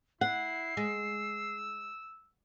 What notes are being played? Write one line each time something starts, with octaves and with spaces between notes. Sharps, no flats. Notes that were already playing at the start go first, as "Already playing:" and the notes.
E4 F#5 C7
G#3 E6